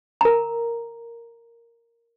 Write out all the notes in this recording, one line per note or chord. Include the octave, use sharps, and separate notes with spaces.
A#4 A#5